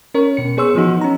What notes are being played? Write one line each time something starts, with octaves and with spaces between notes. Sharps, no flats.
C#4 A#4 C#5
B2 C#7
B3 G#4 C#5 C6 E6
E3 F3 B3 D#4 F#4
C#4 A#5